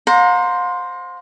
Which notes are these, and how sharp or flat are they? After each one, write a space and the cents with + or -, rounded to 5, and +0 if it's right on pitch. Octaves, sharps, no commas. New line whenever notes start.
C5 +0 F5 +45 A#5 +0